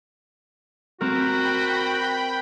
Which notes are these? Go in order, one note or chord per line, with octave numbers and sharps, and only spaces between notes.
C4 F#4 A#4 G5 B5